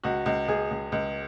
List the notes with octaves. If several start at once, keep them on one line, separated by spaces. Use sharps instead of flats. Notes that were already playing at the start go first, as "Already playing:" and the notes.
C#2 F#4
C#2
C#2 G#4
C#2
C#2